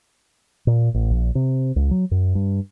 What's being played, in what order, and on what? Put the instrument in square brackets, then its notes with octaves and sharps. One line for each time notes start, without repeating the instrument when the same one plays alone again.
[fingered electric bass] A#2
A1
A#1
C3
C#2
F#3
F#2
G2